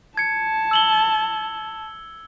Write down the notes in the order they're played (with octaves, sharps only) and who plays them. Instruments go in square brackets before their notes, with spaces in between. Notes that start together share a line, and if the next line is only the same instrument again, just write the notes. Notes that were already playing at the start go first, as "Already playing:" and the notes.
[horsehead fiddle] A5 [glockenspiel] G#6 C#7
[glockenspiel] E6 F#7 G7